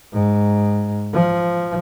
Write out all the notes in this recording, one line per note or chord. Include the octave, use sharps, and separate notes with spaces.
G#2
F3